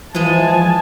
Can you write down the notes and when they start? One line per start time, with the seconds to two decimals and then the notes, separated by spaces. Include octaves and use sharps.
0.15 E3 F3 G#3 G#5 A5